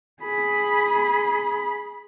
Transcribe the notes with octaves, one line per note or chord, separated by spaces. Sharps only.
G#4 B5